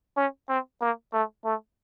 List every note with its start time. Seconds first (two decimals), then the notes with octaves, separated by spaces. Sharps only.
0.17 C#4
0.49 C4
0.81 A#3
1.13 A3
1.45 A3